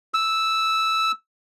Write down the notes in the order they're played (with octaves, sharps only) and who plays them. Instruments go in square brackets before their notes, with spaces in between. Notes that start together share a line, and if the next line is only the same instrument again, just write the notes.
[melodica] E6